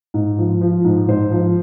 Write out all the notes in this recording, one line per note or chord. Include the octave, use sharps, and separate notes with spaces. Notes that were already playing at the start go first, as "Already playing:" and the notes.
G#2
F3
F3
G#2
G#2 C5
F3